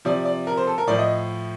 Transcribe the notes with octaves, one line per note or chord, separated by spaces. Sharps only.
C3 F3 D5
D5
A#4
C5
A4
A#4
A2 F3 D5
D#5